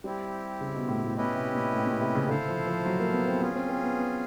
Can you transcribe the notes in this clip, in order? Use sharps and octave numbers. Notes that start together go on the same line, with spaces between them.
G3 C4 E4 G4
C#3
B2
A2
A2
B2 C#4 E4 G4 B4 D#5
C3
A#2
A2
A#2
C3
C#3
D3 E4 A4 C5 F5
F3
F3
F#3
A#3
B3
C4
B3 C#4 F4 G#4
C4
C4
B3
B3